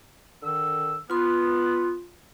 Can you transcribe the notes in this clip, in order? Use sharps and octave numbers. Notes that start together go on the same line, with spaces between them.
D3 D#3 E6
B3 F4 C6